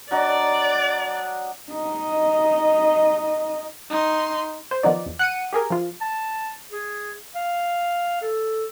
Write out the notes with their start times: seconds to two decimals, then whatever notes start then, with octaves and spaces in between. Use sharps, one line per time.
0.11 F#3 D4 D5 D#5
1.71 D#4 D#5
3.90 D#4 C6
4.71 C5
4.83 D#3 F3 B3 D#4 D5
5.06 E2
5.19 F#5 C#7 D#7
5.53 G4 G#4 A#4
5.70 F3 F4
6.01 A5
6.71 G#4
7.35 F5
8.22 A4